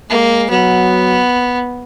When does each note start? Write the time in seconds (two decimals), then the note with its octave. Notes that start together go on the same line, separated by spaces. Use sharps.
0.10 G#3 A#3
0.50 F#3 B3